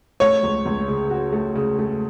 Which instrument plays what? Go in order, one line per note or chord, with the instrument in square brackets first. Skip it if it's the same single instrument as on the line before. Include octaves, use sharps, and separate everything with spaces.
[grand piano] A3 [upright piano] C#5
[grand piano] C#2
C#2
C#3
F#4
A3
C#3
A3